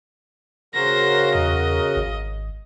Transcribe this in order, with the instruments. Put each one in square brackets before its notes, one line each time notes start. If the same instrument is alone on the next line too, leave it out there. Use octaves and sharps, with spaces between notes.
[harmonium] C#3 F#4 A#4 [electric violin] C5 A#6
[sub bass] E2 [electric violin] D#5
[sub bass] G#1